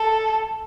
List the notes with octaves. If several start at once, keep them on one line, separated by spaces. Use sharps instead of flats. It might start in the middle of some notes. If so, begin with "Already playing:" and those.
Already playing: A4